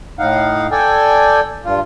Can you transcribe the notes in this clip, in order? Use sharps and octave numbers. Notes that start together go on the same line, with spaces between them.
A2 D#4 F5 F#5
A4 D5 G5 G#5
G2 F4